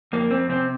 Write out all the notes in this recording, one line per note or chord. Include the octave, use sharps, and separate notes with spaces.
F2 A#3
F2 C4
C3 C4